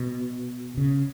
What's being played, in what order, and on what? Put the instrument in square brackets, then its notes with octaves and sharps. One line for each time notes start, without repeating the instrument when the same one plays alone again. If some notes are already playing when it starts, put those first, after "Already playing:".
Already playing: [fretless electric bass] B2
C#3